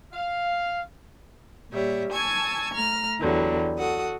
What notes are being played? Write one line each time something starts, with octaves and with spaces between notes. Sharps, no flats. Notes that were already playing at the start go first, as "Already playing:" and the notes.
F5
A#2 G3 C#5 E5
G#5 A5 C#6 E6 G#6
A3 A#5 F6
E2 D3 F#3 G3
F#4 A4 F#5 D#6